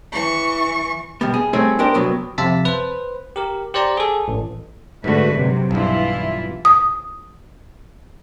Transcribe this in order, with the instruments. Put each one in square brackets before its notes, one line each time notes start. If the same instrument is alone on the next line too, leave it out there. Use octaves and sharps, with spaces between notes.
[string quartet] E3 C#6
[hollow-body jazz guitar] B2 G3 B3
G#4
G3 A3 C4 C#4 D#4 G#4
B3 D4 G4 A#4 C5
C2 F#3 B3
[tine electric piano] F2 C3 E5 A5 A6 B6
B4 C5
G4 A#4
G4 C5 D5 A#5
G#4 A4
A1
[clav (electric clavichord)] G#2 D3 [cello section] A3 F#4 B4
[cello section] C3 F#3
[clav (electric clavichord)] B1 G2 [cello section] E3 E4 F4
[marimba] D#6